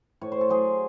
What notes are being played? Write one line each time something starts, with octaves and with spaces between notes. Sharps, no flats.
A2 C#5
C5
A4
F#3 G#4 C5